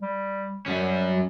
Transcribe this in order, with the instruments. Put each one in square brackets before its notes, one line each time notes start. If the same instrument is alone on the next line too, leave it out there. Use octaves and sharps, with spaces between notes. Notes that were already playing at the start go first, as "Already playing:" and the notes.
[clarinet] G3
[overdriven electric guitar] F#2 C#4 [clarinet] G3